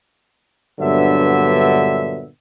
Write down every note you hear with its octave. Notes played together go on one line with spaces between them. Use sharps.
G2 A#2 D3 F#3 B3 E5